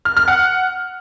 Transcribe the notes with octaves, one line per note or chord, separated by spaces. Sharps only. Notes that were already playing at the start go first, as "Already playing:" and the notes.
F6
F6
F#5